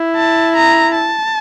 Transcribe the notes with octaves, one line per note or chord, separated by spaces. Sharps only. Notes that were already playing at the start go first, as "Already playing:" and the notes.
Already playing: E4
A5
A#5
A5